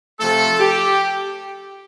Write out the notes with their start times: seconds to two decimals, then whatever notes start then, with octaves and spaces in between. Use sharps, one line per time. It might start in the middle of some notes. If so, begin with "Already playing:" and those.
0.19 C3 F3 A3 A4
0.59 G4